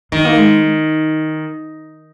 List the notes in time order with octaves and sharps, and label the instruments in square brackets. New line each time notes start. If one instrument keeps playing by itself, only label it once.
[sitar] D#3 [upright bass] G#3
[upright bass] A#3
G#3